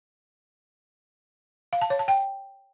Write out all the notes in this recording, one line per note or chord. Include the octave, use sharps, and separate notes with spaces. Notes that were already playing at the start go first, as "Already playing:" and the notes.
F5
A5
C#5
A5
G5